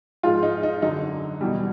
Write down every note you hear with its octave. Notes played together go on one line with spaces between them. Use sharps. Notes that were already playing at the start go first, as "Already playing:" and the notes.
G#2 F3 G#3 F4
D#4
D#4
F#2 D3 F#3 D#4
E2 B2 G3